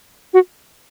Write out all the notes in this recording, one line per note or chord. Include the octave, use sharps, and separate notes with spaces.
F#4